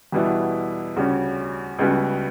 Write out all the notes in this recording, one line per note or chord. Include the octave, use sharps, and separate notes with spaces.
E2 B2 G3 B3 E4
D2 C#3 G3 C#4
C#2 C#3 G3 B3 F#4